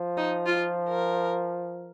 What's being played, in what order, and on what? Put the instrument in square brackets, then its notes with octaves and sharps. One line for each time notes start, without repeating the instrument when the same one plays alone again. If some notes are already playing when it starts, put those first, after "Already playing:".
Already playing: [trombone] F3
[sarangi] D#4
F4
A#4